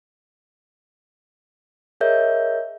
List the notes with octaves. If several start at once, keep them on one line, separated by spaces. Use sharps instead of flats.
G#4 A#4 C#5 D#5 E5 G6